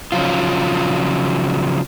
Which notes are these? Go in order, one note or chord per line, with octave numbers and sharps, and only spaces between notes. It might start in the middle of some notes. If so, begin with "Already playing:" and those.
C#3 F3 F#3 F4